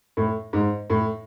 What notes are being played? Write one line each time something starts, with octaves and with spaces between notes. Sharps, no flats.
A2
G#2
A2